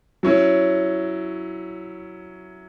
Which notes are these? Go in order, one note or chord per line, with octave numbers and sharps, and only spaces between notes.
F#3 C#4 E4